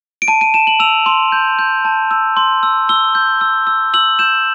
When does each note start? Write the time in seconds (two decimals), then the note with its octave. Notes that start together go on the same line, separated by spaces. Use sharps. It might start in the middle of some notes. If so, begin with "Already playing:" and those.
0.22 D7
0.28 A5 D#7
0.41 D#7
0.54 A5 E7
0.67 F#7
0.80 E6 F7
1.06 C6
1.32 G6
1.59 G6
1.85 A5
2.11 E6
2.37 C6
2.63 E6
2.89 E6 G7
3.15 G6
3.41 E6
3.67 E6
3.94 E6 F#7
4.19 G6 E7